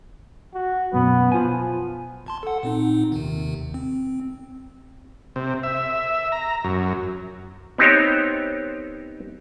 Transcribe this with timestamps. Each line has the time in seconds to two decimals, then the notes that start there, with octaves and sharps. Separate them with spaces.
0.54 F#4
0.93 F#2 B2 B3
1.32 F3 F4 G#5
2.26 G#1 A5 C6
2.43 A4 F#5
2.63 A#2 C4 D#4
3.12 D#2 C3 D#3
3.74 C4
5.36 C3
5.63 E5
6.32 A#5
6.64 F#2
7.78 B3 C4 D#4 G4 C5 C#5